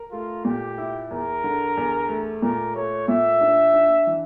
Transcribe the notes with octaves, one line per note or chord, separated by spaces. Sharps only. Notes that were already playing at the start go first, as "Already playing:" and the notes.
Already playing: A#4
A3 F4
A#2 G4
E4
E2 A#4
D3
E2
A3
A#2 A#4
A3 C#5
A#2 E5
D4
D4
E3